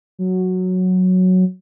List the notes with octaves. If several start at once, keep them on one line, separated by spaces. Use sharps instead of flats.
F#3